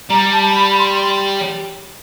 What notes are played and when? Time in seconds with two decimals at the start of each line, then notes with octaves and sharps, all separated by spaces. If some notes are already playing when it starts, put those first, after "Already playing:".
0.09 G3 A#5
0.32 A5
0.55 B5
0.78 C6
1.01 C6